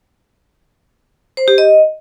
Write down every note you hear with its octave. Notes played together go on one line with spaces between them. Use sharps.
C5
G4
D#5